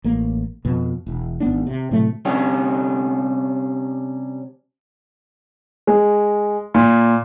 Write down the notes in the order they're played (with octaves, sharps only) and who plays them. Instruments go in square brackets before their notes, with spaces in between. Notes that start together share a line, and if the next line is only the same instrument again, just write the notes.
[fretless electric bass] A1 A#3
F2 B2
E1
G#1 B3 D4
C3
A2 C3 F#3 A3
[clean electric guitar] C3 G3 C#4 D4 G4
[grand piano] G#3
A#2